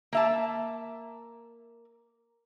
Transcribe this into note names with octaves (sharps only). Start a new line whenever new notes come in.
A#3 E5 A5